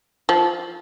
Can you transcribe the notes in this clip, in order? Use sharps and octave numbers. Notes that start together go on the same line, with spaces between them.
F3